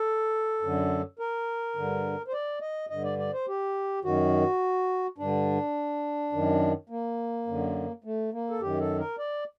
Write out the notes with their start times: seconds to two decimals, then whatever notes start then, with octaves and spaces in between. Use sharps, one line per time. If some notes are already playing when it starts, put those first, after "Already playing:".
Already playing: A4
0.62 F#2 D3
1.19 A#4
1.76 G2 D3
2.28 C5
2.33 D5
2.61 D#5
2.90 G2 D3 D#5
3.04 D5
3.19 D5
3.33 C5
3.48 G4
4.04 F#2 D#3 F#4
5.18 G2 D3 D4
6.33 F#2 D#3
6.89 A#3
7.47 F#2 D3
8.04 A3
8.33 A#3
8.50 A4
8.61 F#2 D#3 G4
8.80 A4
8.99 A#4
9.18 D5